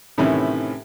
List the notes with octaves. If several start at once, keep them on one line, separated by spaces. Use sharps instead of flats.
A2 C3 D#3 E3 C#4